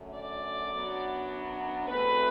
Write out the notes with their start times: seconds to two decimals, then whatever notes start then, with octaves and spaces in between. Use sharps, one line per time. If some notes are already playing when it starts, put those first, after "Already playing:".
Already playing: F#2 D3 A3
0.15 D5
0.73 F#2 F#3 B3 D4
1.88 E2 B2 A3 C4 B4